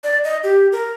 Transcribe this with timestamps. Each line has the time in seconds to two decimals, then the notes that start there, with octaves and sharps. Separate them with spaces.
0.04 D5
0.24 D#5
0.44 G4
0.72 A#4